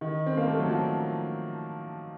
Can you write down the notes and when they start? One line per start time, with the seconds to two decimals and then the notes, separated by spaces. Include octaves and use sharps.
0.01 D#3
0.26 C4
0.37 A#3
0.48 A3
0.59 F#3
0.69 F3